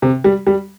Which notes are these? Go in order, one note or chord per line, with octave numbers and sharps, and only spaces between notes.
C3
G3
G3